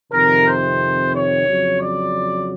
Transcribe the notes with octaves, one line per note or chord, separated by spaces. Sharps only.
F2 C3 D#3 A#4
C5
C#5
F2 C#3 F#3
D5